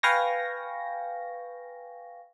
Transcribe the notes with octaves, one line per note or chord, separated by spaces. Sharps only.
B4 F5 G5 G#5 C#6 A#6